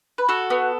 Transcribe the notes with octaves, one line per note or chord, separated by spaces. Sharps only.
B4
F#4 A4
B3